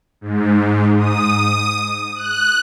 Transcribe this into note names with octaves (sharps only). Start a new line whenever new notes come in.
G#2
D#6
F#6